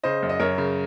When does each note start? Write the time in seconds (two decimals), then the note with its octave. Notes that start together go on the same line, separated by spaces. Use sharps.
0.03 C#3 C5 D#5
0.23 F#2
0.29 D#5
0.40 F#2 A#4 C#5
0.58 C#3